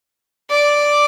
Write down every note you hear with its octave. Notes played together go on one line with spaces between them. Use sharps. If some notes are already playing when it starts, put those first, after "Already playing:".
D5